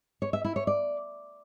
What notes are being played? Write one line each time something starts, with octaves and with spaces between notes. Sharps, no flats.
C#5
E5
E4
C#5
D5